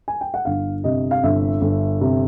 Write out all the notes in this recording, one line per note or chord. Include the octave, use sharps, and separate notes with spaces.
G#5
G5
F#5
G1 F5
C3 D#5
F5
G1 E5
G1
C3